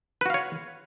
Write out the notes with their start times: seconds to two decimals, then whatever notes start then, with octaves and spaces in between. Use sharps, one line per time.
0.21 B4
0.26 F#4
0.30 F5
0.34 C#5